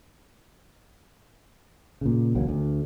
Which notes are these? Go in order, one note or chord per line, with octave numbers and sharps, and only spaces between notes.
A#2 C#3
E1 C#2 F#3 A#3
D2